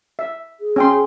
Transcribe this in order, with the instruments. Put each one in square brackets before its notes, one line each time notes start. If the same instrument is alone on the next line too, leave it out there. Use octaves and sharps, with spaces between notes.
[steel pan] E5
[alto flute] G#4
[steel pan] C#4 G5 C6